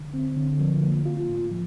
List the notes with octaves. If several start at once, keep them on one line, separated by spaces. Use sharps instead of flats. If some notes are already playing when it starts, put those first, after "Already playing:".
Already playing: D3
C4
D3
F3
A#3
F4
A2
F3